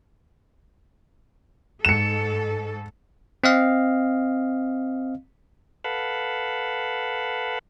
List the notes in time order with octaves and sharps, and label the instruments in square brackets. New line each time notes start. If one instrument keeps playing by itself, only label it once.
[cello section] G#2 A4 [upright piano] C#7 E7
[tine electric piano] C4 D#5 F5
[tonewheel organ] A4 B4 F5 F#5 A5 B5